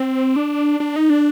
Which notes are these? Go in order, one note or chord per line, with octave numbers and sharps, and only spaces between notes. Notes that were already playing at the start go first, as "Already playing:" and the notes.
Already playing: C4
D4
D4
D#4
D4